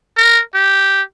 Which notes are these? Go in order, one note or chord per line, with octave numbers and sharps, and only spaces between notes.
A#4
G4